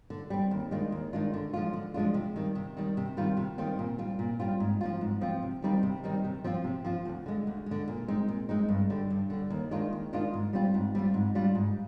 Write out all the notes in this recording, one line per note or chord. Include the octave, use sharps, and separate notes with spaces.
D3
G3 C4
D#2
D#3 G#3 D4 F4
D#2
D#3 G#3 D4 F4
D3
F3 G#3 D4 F4
D3
F3 G#3 D4 F4
C3
D#3 G3
C3
D#3 G3
C3
D#3 G3 C4 F4
C3
D#3 G3 C4 F4
A#2
G3 C4 F4
A#2
G3 C4 F4
G#2
F3 C4 F4
G#2
F3 C4 F4
C3
D#3 G3 C4 D#4
C3
D#3 G3 C4 D#4
C3
F3 C4 F4
C3
F3 C4 F4
D2
D3 G#3
D2
D3 G#3
A#2
G#3 C4 D#4
A#2
G#3 C4 D#4
G2
D3 G3
G2
D3 G3
D#2
D#3 G#3 D4 F4
D#2
D#3 G#3 D4 F4
G#2
G3 C4 F4
G#2
G3 C4 F4
G#2
G3 D4 F4
G#2